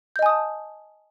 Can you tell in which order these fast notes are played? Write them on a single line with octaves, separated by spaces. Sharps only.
G6 D#5 G#5 D#6 A5